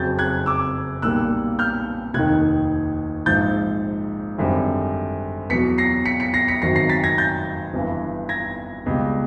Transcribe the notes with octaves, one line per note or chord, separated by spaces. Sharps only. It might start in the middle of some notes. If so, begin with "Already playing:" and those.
Already playing: F#1 F2 C#3 F#3 G6 A6
F#6 G#6
D6 E6
B1 A#2 G3 A#3 E6 F#6
F6 G6
F1 D#2 D#3 F#6 G#6
A#1 G#2 F3 G6 A6
G#1 F#2 D3 G3
E2 B2 F#3 B6 C#7
A#6 C7
B6 C#7
B6 C#7
A#6 C7
B6 C#7
G#1 F#2 D#3 F#3 A#6 C7
A#6 C7
A6 B6
G#6 A#6
G6 A6
G1 G2 E3
G#6 A#6
C#2 B2 G3